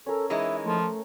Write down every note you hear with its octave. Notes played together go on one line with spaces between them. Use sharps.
C#4 A4 A#4
E3 G#3 D#4 E5
F3 A3